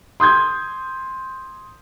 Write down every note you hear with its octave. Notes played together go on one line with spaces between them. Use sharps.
C6 D#6 G6 G#6